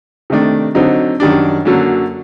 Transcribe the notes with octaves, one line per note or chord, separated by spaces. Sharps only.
C3 D#3 A3 D4
D3 F#3 C4 D#4
F#2 D#3 G3 D4
F#2 D3 F#3 A#3